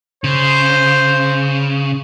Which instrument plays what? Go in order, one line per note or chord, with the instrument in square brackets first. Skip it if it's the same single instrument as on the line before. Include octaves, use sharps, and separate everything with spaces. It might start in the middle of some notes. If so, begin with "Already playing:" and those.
[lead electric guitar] C#3 [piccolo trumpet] C5